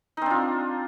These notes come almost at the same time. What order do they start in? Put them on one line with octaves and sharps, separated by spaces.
D#4 C4 D4 F4